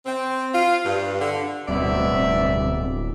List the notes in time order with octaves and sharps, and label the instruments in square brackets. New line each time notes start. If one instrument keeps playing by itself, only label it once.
[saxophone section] C4
F4
G2
D3
[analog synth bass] D1 [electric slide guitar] G2 B2 [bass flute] C4 [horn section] D5 E5